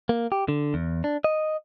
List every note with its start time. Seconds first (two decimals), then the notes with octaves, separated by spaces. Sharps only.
0.09 A#3
0.32 G4
0.48 D3
0.74 E2
1.04 D4
1.24 D#5